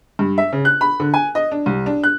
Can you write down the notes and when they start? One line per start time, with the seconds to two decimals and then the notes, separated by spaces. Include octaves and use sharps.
0.19 G2
0.38 E5
0.53 C#3
0.65 F#6
0.81 B5
1.00 D3
1.14 G#5
1.35 D#5
1.52 D4
1.66 C2
1.86 D4
2.03 F#6